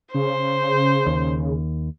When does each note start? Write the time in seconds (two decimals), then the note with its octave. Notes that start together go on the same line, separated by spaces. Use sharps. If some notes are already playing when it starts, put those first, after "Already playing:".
0.14 C#3 C5
1.06 D#2